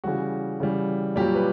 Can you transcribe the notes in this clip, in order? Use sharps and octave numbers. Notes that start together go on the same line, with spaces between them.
C#3 E3 G3 F#4
C#3 E3 G3
A#2 F#3 G3 G4
B4